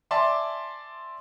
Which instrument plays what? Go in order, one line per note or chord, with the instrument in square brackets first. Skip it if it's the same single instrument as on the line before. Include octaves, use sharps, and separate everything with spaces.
[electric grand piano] D5 E5 G#5 A5 C6 D6